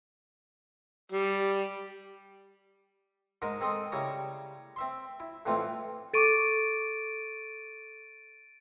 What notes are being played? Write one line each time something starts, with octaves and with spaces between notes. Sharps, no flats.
G3
G#2 G#3 A#4 D#5
C4 G#4 A4 D#5 C6 D#6
C#3 G3 E4 C#5 A#5
C4 E5 C6
E4
F2 A2 E3 A3 C4 F4
A4 C#6 D6 A6 D7 D#7